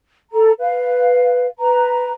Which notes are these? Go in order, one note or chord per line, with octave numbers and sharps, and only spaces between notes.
A4 A#5
B4 F5
B4 A#5